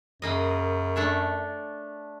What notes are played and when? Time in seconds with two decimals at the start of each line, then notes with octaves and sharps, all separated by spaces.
0.22 F#2 C#3 A#3 D#5
0.96 A3 D4 C#5